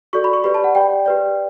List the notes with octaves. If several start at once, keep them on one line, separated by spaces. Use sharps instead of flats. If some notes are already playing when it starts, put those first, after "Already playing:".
F#4 A4 D5 C#6
B5
C#6
G4 B4 D5 B5
A5
F#5
G4 D5 G5
G4 B4 D5